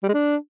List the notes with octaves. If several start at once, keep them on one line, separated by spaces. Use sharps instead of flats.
G3
G#3
D4